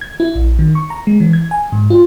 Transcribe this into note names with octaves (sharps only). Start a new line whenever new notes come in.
G#6
E4
A#1
D#3
C#6
A#5
G#3
E3
G#6
G#5
G#2
F4